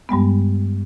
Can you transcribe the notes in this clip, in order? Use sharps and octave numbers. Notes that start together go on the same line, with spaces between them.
G2 G3 G#3 B3